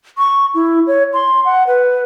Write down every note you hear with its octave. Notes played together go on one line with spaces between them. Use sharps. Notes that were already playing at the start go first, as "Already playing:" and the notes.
C#6
E4
C#5
C6
F#5
B4